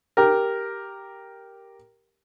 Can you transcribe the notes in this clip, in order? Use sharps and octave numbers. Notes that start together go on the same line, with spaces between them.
G4 A#4